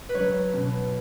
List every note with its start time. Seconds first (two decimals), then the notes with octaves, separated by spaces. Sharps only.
0.09 B4
0.15 F#3 C#5
0.54 B2